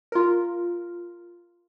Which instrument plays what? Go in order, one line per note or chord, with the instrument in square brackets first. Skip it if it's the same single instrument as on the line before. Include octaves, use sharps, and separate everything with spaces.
[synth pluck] F4 A#4